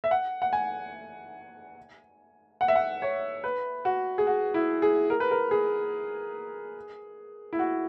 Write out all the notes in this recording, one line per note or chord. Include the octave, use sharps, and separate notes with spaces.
E5
F#5
F#5
G#5
F#5
E5
F#5
C#5
B4
F#4
G#4
F#4
E4
G#4
A#4
B4
A#4
G#4
E4
F#4